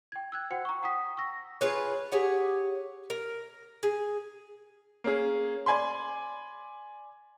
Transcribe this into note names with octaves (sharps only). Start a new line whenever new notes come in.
G5 G#6
E6 F#6 G#6
F#4 C5 F#5 G5 C#7
A#5 C#6
F#5 G5 A#5 D#6 B6
C#6 E6 A#6
F4 G#4 B4 C#5
G4 G#4 C#5 F#5
A#4
G#4
A#3 C#4 G#4
D5 G#5 B5 C6